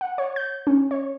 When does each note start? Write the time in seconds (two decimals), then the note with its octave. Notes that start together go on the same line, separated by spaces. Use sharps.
0.01 F#5
0.18 C#5
0.36 G6
0.67 C#4
0.91 C#5